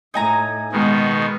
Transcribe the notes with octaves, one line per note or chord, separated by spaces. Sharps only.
A2 D#4 G#5 A#5
B2 D#3 G#3 B3